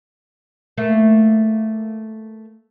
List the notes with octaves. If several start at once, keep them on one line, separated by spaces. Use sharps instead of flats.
A3 A#3